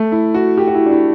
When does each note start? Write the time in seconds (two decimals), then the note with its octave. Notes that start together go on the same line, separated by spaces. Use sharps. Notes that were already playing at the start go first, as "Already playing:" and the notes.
Already playing: A3
0.12 E4
0.34 F#4
0.58 G4
0.68 F#4
0.75 E4
0.86 D4
0.92 E4